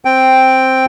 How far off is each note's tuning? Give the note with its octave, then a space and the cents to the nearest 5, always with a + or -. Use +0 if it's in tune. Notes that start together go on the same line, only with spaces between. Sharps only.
C4 +0 G5 +0